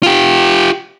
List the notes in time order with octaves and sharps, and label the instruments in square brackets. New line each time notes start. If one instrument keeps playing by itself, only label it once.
[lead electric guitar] F4 G4